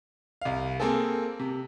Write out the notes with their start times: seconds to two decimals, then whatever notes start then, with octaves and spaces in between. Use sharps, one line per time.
0.41 C2 F5
0.80 A#3 C4 G#4 A4
1.40 C3